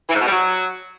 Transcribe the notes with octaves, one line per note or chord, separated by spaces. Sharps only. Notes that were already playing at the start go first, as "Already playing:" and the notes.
E3
G#2
B2
G3
F#3